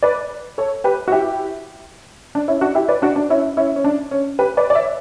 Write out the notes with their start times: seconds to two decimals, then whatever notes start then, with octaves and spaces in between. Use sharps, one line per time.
0.03 B4 D5
0.58 A4 C#5
0.84 G4 B4
1.08 F#4
1.12 E4 G4
2.35 D4
2.48 C#4 E4
2.61 D4 F#4
2.75 E4 G4
2.88 B4 D5
3.02 D4 F#4
3.16 D4
3.30 C#4 E4
3.57 C#4 E4
3.76 C#4
3.84 D4
4.11 C#4
4.39 G4 B4
4.57 B4 D5
4.70 D5
4.75 C#5 E5